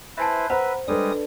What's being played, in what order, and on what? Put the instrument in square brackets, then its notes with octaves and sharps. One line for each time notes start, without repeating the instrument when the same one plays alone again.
[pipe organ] E4 B4 C5 [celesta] E5 G#5 A5
[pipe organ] B4 E5 [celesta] C5 [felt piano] F#5 A#5 B5
[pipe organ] G3 G#3 D#6 [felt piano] D4 A4 B4